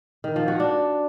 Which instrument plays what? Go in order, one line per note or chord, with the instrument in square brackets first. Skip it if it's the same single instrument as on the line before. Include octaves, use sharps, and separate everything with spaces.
[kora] D#3
F3
F#4
D4